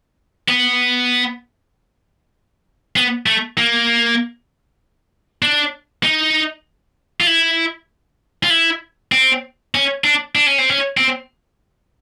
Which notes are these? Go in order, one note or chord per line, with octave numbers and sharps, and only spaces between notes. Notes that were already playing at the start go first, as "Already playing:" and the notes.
B3
B3
A3
A#3
D4
D#4
F4
E4
F4
E4
C4
C#4
D4
D4
C#4
C4
C#4
C4